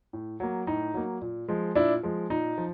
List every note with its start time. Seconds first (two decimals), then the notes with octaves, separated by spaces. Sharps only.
0.13 A2
0.40 F#3 A#3
0.67 A2 D#4
0.94 F#3 A#3
1.22 A#2
1.48 F3 G#3
1.75 A#2 D4 E4
2.03 F3 G#3
2.30 A#2 D#4
2.58 F3